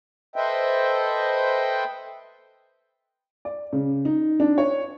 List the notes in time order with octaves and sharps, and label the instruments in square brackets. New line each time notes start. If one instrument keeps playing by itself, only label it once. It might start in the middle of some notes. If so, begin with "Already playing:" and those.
[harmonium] A4 B4 C5 D#5 E5 G5
[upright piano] D5
C#3
D#4
D4
C#5